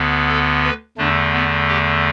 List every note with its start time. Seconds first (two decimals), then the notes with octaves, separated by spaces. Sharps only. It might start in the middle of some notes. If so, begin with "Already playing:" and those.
Already playing: D2 D3 B3
0.28 A4
0.63 B4
0.97 E2 D3 A3 D4
1.33 B3
1.68 G4